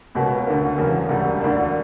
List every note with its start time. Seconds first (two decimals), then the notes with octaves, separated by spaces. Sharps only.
0.15 C#2 B2 A#3 C#4
0.46 D2 D3 A#3
0.77 E1 E2 C#3 F#3 A#3
1.09 E1 D2 D3 G3
1.41 D2 D3 A#3 D4